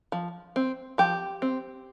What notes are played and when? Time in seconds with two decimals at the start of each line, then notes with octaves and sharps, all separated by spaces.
0.12 F3
0.56 C4
0.98 F3 G4
1.42 C4